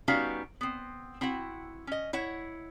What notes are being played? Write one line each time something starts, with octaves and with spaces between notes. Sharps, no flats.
G3 B3 C#4 D#4 F#4 F5
B3 C4
C4 E4 F#4 F#5
C#4 D#5
E4 C#5 F#5